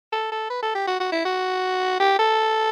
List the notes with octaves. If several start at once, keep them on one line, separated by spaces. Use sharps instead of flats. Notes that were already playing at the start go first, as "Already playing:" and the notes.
A4
A4
B4
A4
G4
F#4
F#4
E4
F#4
G4
A4